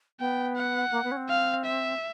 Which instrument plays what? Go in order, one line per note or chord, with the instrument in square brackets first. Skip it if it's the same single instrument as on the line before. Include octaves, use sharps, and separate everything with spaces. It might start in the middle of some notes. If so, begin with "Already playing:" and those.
[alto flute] B3 [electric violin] G5
[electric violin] F#5
[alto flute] A#3
B3
C#4
C4
[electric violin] F5
E5